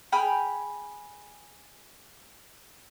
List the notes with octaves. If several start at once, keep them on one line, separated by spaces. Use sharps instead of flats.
G#4 G5 B5 F6